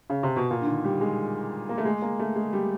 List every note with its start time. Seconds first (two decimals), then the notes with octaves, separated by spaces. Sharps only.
0.10 C#3
0.23 C3
0.36 B2
0.51 A#2
0.61 D3
0.67 D#3
0.84 G3
1.01 G#3
1.69 A#3
1.78 A3
1.85 G#3
2.02 A#3
2.19 A3
2.36 G#3
2.53 G3